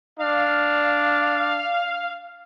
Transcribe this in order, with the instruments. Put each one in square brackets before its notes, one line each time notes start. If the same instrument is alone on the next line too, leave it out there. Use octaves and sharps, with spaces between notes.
[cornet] D4 [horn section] F5